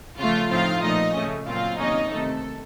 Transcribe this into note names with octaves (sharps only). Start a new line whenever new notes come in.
C#3 F3 A3 F4 F5
A2 F3 C4 D#4 F4 F5
A#2 F3 A3 D#4 D#5
C#3 A3 C#4
A#2 F#3 C4 F4 F5
C3 D#3 A#3 C#4 D#4 D#5
C3 D#3 A3 A4